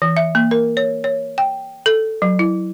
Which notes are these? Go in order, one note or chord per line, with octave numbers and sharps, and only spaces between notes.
E3
E5
A#3
A#4
C#5
C#5
G5
A4
F#3
E4